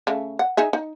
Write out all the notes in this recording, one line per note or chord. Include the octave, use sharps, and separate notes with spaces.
C#3 A3
F#5
D#4 G#4 E5
D#4